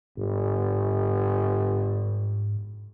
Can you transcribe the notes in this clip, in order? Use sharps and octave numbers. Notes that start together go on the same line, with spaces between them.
G1 G#2